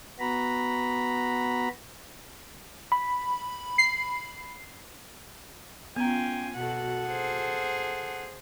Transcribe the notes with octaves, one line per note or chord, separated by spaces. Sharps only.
B3 F#4 A#5 B5
B5
C7
B3 C#4 F4 G5 G#5 A#5
B2 F#4 A4 F#5
G#4 C5